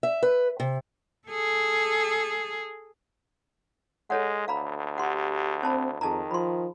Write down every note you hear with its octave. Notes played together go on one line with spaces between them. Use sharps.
E5
B4
C3
G#4 A4
G#3 A4 C#5 F#5
D2 F5 A#5 B5
G4 F#5 C6
C4 C5 A5 B5
F2 D#3 G#4 A5 A#5
F3 B5 C6